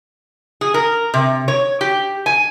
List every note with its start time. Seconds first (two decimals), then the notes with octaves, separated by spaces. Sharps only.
0.61 G#4
0.74 A#4
1.14 C3
1.48 C#5
1.81 G4
2.26 G#5